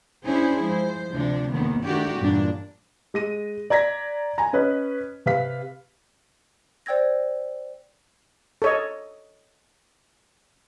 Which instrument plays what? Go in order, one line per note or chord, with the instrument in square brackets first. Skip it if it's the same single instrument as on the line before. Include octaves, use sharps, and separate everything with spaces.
[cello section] C#4 D4 E4 G#4 C5
F3 G#3 C5
D2 C3 F3 D4
D#2 D#3 B3
D2 D#3 A3 D4 F#4 G4
E2 G2 A#2 A#3 D4
[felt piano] G#3 A#6 D#7
D5 A#5 G#6 A#6 B6
G#5 A#5
C#4 B4 C#5 D#5
C3 B4 F5 B6
[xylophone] C5 D5 G5 E6 G#6 A#6
[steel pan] A4 C#5 D#5